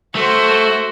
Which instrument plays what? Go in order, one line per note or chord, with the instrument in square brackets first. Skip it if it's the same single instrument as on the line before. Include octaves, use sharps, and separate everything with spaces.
[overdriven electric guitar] A3 [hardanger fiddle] F#4 C5